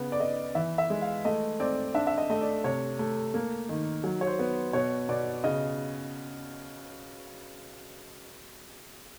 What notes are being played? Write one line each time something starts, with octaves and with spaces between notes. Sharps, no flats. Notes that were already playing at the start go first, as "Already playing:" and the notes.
Already playing: C#3 B3
D5
B3 D#5
E3 E5
E5
G#3
F5
A3 D#5
C4 D5
D4 E5
E5
D#5
A3 D#5
D5
C3 C#5
A3
A#3
D#3
F#3
C#5
C5
B3
B2 C#5
B2 D5
C#3 D#5